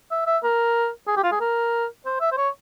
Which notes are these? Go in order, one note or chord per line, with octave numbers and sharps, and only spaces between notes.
E5
E5
A#4
G#4
G4
F4
G#4
A#4
C5
E5
C5
C#5